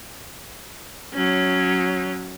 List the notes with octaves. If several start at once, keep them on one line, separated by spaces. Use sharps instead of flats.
F#3 C#4